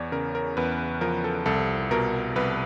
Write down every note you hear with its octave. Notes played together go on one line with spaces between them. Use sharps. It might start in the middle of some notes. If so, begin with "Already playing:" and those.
Already playing: E2 C#5 D5
C#3 A#4
A#4
E2 B4
F3 A#4
A4
C2 A4
B2 A#4
C2 B4